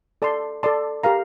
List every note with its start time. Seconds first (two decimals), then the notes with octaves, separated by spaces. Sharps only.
0.22 A4 D5 A5 C6
0.63 A4 D5 A5 C6
1.03 G4 A#4 F5 A#5